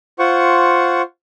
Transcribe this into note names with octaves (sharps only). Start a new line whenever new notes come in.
F4 C5 F#5 C#6